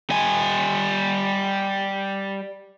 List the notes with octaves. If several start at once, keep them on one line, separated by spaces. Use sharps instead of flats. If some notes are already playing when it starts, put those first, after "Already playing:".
G3 G#5